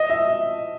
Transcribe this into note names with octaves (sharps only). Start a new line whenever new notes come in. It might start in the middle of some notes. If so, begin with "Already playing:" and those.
Already playing: D#5
E5